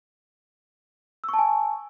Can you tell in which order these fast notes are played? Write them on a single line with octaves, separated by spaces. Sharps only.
E6 C#6 A5 G#5